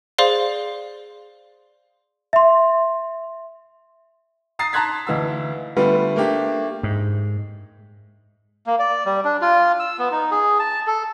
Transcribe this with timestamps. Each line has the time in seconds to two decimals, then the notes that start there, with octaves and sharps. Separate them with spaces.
0.18 G#4 C5 D5 F5 C6
2.33 E5 C6
4.59 A#5 D#6 A6 C7
4.73 A5 A#5 C6 F#6 G#6 B6
5.07 D2 E3 D#4 F5 E6
5.76 D3 G3 A3 B3 F4 B4
6.16 A3 A#3 D4 G4
6.83 G#2
8.67 A#3
8.79 D5
9.06 G3
9.25 D4
9.41 F4
9.80 E6
9.99 B3
10.12 D#4
10.31 G#4
10.59 A5
10.87 A4